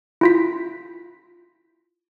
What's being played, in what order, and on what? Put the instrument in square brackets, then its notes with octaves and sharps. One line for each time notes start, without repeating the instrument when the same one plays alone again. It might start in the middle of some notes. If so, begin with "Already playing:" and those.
[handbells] E4 F4 B6